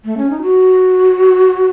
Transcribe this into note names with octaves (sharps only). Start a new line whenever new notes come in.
A3
C#4
D#4
F#4